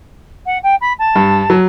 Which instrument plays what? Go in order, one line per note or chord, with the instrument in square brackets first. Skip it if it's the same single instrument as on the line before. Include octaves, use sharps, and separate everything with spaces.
[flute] F#5
G5
B5
A5
[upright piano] G2
F#3